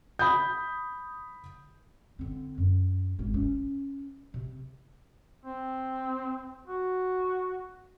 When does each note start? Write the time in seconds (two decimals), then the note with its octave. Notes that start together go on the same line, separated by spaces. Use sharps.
0.19 B5 D#6 G6
2.19 D3 C4
2.58 F#2
3.19 G#1
3.34 C#4
4.34 C3
5.45 C4
6.67 F#4